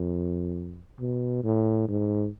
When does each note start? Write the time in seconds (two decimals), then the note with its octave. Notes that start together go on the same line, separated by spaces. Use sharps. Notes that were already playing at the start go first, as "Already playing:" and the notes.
Already playing: F2
1.00 B2
1.44 A2
1.88 G#2